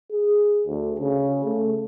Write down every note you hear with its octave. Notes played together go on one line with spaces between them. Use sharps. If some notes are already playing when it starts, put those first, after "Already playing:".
G#4
D2
C#3
A3